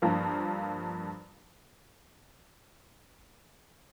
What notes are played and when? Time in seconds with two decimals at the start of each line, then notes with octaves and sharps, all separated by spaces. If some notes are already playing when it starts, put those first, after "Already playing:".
0.02 G2 F3 A#3